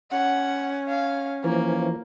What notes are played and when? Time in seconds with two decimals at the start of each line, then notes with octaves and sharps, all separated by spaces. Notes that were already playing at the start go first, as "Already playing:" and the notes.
0.11 C#4 F#5
0.89 F5
1.44 E3 F3 A#3